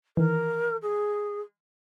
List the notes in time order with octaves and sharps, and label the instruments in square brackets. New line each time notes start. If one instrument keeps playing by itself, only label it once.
[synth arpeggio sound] D#3 E3 [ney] A#4
[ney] G#4